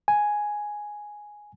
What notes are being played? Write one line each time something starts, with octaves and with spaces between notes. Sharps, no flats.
G#5